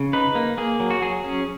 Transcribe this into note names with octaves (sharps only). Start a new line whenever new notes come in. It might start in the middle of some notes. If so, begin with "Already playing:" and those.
Already playing: C#3
D#4 B4
A#3
A#3 G#4
F#3
F#4
F#3 G#4
C#4